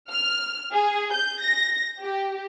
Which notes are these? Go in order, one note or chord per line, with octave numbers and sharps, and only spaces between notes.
F6
G#4
G6
A#6
G4